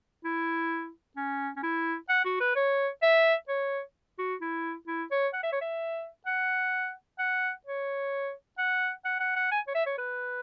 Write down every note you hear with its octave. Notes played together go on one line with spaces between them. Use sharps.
E4
C#4
C#4
E4
F#5
F#4
B4
C#5
E5
C#5
F#4
E4
E4
C#5
F#5
E5
C#5
E5
F#5
F#5
C#5
F#5
F#5
F#5
F#5
G#5
C#5
E5
C#5
B4